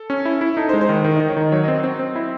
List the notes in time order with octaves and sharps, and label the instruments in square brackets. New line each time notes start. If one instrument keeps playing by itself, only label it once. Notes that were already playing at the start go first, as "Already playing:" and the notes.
Already playing: [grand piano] A4
[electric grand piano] C#4
E4
E4
[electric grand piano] D#4 [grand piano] A4
[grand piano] C5
[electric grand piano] G#3
[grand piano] C5
[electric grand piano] D#3 [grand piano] D#4
[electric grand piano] D#3 [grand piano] D#4
[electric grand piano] D#3 [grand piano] D#4
[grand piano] C#5
[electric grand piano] D#3 [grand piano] D#5
[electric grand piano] F#3 [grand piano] C#5
[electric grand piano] C4 [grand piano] D#5
[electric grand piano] C4
C4
E4